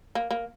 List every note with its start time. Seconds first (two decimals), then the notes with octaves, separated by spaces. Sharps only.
0.15 A#3
0.31 A#3